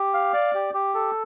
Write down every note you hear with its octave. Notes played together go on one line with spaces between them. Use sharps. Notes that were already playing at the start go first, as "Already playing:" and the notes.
Already playing: G4
F5
D5
G4
G4
A4